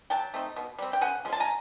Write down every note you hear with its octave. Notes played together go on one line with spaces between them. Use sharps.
F#3 G5 A5
A3 C4 D#4
B2
G3 C4
G5
C#3 F#5 G#5
F3 G#3 C#4
A5
G#5 A#5